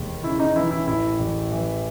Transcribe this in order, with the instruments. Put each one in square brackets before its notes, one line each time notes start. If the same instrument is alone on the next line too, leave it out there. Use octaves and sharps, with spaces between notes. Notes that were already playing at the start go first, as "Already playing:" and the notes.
Already playing: [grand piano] E1 D#2
[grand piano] C#3 [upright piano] E4
[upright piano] D#4
[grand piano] E3 [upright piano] E4
[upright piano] E4
[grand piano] A1 [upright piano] E4
[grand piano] A1
E3